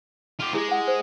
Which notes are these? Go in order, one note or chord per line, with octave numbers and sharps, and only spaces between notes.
F4 G4
G#3 E4 G4 D6
G#4 F#5
C5